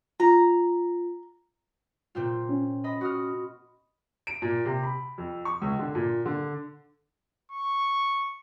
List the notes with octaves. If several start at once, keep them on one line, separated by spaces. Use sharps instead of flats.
F4 A#5
A#2 C4 F4
C#4
D#5 B5
F#4 D#6 F6
D7
A#2
C3
B5
F2
C#6
C#2
D3
A#2
D3
C#6